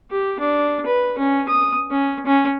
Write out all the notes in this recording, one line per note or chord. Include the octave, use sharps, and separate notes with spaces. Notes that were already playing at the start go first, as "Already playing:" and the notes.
G4
D4
B4
C#4
D#6
C#4
C#4